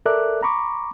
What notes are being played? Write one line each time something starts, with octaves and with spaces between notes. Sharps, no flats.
A4 A#4 D5 E5 D6 F#6
A#5 B5 C#6 D6